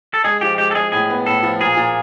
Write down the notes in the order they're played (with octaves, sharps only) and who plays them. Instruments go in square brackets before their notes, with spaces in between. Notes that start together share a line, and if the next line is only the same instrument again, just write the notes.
[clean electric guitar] A4
[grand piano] G#3 [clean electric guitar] G#4
[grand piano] F3 [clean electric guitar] G4
[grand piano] G#3 [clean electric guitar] G4
[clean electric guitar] A4
[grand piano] G#3 [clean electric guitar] G#4
[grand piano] A2 [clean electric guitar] G#4
[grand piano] B3
[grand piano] A2 [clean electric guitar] A4
[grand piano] F3
[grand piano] A#2 [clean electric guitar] G#4
[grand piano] A#2